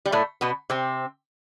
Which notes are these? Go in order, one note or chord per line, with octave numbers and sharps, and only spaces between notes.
G3
A2 A3
B2 B3
C3 C4